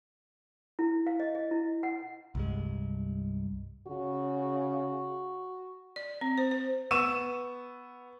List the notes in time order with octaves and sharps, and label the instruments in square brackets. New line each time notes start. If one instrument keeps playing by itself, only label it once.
[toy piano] E4
F5
D#5
D#5
E4
F#5
[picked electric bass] C2 G2 G#3
[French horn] C#3 [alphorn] F#4
[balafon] D5
C4
C5
C5
[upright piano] B3 C#6 E6 D#7 E7